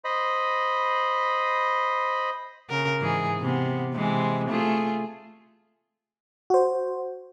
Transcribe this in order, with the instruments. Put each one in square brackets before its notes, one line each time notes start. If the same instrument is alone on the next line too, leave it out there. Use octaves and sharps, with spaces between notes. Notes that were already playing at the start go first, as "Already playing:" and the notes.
[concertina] C5 D#5 B5
[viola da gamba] C#3 A#4
G#2 E3 G#4
C3 B3
C3 E3 G#3
A3 F4 G#4
[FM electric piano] F#4 C5